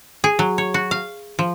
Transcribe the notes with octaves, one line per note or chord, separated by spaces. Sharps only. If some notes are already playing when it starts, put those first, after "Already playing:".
G#4
F#3
C#5
F#4
F5
F3